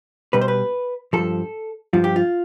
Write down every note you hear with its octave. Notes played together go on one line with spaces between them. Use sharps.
B2 G3 B4
C5
B4
G2 F3 A4
G2 F3 F4
G4
F4